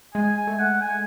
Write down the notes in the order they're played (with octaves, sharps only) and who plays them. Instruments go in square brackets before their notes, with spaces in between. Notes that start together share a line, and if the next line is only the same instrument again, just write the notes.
[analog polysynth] G#3 [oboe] G#5
[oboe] G#5
[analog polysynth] A3
[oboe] F#5
G#5